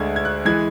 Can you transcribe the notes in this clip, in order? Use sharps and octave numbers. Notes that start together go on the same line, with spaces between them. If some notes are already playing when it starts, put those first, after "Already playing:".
Already playing: D2 D3 G#3 G#6
G#6
F#6
E3 G#3 G#6